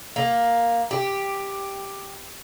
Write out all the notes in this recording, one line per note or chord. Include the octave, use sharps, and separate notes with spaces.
A#3
G4